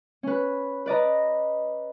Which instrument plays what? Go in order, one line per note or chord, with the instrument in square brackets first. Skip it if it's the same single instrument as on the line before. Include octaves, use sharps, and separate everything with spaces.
[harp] C#4 B4
B4 D5 D#5 A#5